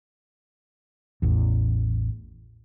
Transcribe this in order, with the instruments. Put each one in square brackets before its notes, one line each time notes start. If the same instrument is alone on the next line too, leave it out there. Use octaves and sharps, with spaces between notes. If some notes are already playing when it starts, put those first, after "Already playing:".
[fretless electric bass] A1 E2